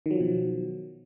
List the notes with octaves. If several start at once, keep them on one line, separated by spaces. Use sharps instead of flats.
B2 D#3 F3 F#3